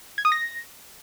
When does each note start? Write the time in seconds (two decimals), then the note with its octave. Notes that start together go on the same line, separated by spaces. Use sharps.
0.18 G#6
0.25 D#6
0.32 A#6